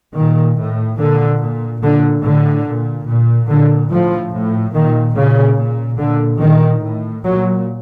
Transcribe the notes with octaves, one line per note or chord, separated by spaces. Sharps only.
A#2 D#3
A2
A#2 D3
A#2
A#2 D3
A2 D3
A#2
A#2
A#2 D3
A2 F3
A2
A#2 D#3
A#2 C#3
A#2
A#2 D3
A#2 D#3
A2
A#2 F#3